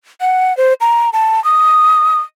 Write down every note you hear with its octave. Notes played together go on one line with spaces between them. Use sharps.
F#5
C5
A#5
A5
D#6